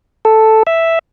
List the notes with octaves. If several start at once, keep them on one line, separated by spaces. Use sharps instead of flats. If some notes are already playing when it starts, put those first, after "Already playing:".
A4
E5